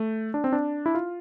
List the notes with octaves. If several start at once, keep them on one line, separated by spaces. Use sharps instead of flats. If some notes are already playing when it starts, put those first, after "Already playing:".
Already playing: A3
D4
C4
D4
E4
F4